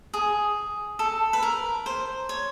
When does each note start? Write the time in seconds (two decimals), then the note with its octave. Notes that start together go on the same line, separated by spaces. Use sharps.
0.14 G#4
0.99 A4
1.33 B4
1.43 A#4
1.86 C5
2.29 C#5